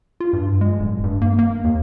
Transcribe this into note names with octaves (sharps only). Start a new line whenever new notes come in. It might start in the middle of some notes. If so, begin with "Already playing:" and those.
F4
G2
G#3
D1
G2
A#3
A#3
D#2